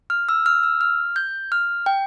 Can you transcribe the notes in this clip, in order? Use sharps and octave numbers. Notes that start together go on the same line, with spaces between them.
F6
E6
F6
E6
F6
G6
F6
G5